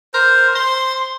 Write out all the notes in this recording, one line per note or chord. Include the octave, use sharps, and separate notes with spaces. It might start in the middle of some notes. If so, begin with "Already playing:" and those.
A#4 C5
C5 C6